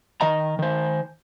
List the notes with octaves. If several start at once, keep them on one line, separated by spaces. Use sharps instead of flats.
D#3 D#5 A#5
D#3 C5